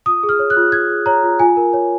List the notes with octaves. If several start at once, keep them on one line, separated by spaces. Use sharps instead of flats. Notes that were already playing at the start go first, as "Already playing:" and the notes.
F4 D#6
G#4
F6
C#5
F#6
F4
F4 G#6
G#4
C#5 A#5
F4
F4 G#5
A#4
C#5